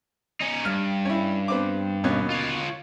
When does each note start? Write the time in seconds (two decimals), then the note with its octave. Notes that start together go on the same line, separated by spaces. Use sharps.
0.40 C#4 D#4
0.65 G2 F6
1.05 C#4 E4
1.48 B3 C4 D6
2.04 D#2 B2 C#4
2.30 F4 C#5